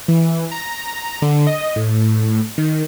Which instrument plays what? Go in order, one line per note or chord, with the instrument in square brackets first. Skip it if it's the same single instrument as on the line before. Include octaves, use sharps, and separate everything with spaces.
[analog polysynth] E3
A#5
D3
D#5
A2
D#3